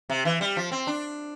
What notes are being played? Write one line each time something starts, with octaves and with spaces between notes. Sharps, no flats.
C3
E3
G3
F3
C4
D4